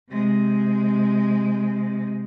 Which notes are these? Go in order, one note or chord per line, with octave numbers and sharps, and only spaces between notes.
C3 G#3